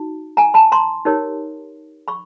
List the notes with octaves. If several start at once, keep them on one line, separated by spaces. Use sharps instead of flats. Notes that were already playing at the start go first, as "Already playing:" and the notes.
Already playing: D#4 F#4
G#5 A#5
A5 B5
A#5 C6
D#4 G4 A#4 C#5
B5 C#6